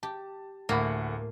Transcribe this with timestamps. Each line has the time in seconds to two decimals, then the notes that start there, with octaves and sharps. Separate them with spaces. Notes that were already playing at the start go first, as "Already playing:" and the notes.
0.03 G4 A5
0.69 D2 A2 A#3 F#5 B5